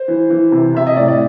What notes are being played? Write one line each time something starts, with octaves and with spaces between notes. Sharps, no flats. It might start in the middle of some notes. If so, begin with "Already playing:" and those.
Already playing: C5
E3
E3
C3
C3 E5
D#5
A2 D5
D5